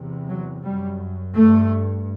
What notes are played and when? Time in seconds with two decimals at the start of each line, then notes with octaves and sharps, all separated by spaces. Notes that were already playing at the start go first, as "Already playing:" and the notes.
Already playing: E2 C3
0.28 F#3
0.63 F#2 G3
1.36 G2 A3